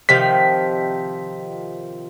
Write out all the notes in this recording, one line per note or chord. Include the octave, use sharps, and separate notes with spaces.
C3 D#3 F3 B6